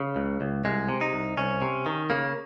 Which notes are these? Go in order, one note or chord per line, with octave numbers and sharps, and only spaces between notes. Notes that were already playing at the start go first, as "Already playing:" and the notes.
Already playing: C#3
C#2
C#2
C2 G#3
C3
D#4
C2
C2 C#4
C3
D#3
C#3 A#3